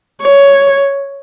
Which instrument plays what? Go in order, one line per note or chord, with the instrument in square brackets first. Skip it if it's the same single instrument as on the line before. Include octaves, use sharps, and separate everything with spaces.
[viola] C#5